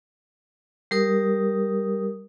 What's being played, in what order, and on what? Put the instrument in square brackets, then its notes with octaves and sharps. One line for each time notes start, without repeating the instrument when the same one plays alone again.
[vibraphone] G3 G4 A#4 D#6